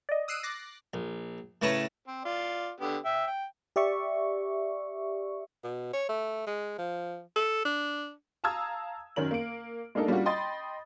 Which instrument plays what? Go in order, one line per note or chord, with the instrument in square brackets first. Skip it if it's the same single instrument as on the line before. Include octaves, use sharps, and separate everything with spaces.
[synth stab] D5 D#5
D#6 E6 F#6 C7 D7 D#7
D6 F#6 A6 A#6 C7
[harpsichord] A#1
A2 C#3 B4 C#5 A5 A#5
[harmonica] C4
F4 D5
D3 B3 G4
E5 G5
G5
[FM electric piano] G4 D5 E5 C#6
[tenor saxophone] B2
C#5
A3
G#3
F3
A4
D4
[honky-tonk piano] F5 A5 A#5 D#6 E6 G#6
F#2 D#3 C#4 A#4 F#7
A#3 D7
G#3 A#3 D4 D#4 A4 A#4
G3 A#3 C#4 D4 F4 F#4
D#5 G5 B5 C6 D#6 A6